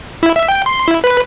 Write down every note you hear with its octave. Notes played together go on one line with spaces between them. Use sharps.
E4
E5
G5
C6
E4
B4